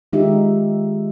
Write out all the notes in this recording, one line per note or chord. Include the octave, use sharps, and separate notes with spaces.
D#3 G#3 D#4 F4 G4 E5